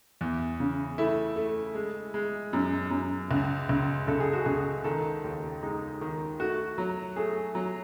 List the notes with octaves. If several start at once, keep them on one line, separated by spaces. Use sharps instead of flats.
E2
C#3
A3 E4
A3
G#3
G#3
F#2
F#2
C#2
C#2
C#2 A4
G#4
F#4
C#2 G#4
D#3 A4
D#2
G#3 D#4
D#3
A3 F#4
F#3
A3 G#4
F#3